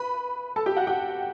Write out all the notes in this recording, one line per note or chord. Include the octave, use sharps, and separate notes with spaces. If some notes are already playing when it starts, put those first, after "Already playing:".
Already playing: B4 B5
A4 A5
G4 G5
F#4 F#5
G4 G5